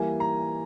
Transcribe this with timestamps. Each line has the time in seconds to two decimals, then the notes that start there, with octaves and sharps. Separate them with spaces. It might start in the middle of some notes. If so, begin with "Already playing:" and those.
Already playing: E3 G3 A#3 G#5
0.20 A#5